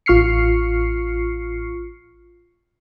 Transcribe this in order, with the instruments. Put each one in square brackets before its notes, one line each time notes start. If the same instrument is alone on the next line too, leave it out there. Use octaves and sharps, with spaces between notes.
[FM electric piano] A1 F4 C#6 F6 C7 C#7